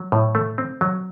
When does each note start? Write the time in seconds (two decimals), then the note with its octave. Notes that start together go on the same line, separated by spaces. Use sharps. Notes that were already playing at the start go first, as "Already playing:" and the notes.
Already playing: F#3
0.12 A2
0.35 A3
0.58 C4
0.81 F#3